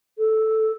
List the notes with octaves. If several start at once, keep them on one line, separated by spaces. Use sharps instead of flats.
A4